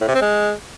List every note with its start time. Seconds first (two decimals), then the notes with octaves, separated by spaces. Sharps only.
0.01 A2
0.08 C3
0.14 C4
0.21 G#3